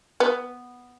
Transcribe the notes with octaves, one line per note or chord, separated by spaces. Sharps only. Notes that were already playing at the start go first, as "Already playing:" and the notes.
B3